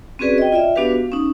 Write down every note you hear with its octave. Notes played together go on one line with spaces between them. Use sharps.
C4 C#4 F#4 G#4 B4 D5
D#5 G5
F4 D5 E5
B3 D4 F#4 G4 B4 F5
F5
C#4 D#4